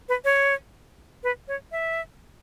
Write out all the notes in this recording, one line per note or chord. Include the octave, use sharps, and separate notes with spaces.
B4
C#5
B4
C#5
E5